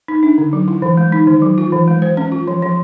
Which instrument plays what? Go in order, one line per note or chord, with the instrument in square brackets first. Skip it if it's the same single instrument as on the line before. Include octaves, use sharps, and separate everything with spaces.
[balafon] D#4
D4
D3
F#3
E4
E3
G#3
D#4
D#3
F#3
F4
E3
G#3
C5
C#4
F4
F3
F3